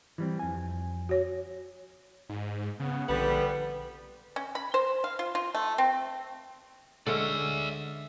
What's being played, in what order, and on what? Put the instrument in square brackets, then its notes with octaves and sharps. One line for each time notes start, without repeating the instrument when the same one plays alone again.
[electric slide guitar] E3 G3 C4
F2 G#5
[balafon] F#4 C#5
[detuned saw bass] G#2
[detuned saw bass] C#3 [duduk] B3
[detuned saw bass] A#1 [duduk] D3 [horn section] G3 B3 [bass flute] B4
[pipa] C#4
B5
C5
F5
F4
F4
A3
C4
[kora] D3 G#3 C#4 [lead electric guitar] D5 E5